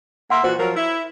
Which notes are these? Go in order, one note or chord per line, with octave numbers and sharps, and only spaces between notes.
A#3 E5 F#5 C6
A#2 E3 F#4 C5
F3 F#3 A#4
E4